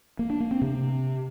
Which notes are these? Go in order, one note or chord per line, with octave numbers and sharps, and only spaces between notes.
A#3
D4
A#3
C4
C3